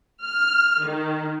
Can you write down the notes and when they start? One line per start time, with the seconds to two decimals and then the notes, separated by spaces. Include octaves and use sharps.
0.23 F6
0.84 D#3